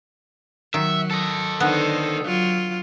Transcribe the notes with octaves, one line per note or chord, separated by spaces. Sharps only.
D#3 F#3 E5
A4 D#5
D3 D#3 B3 C5
F#3 F4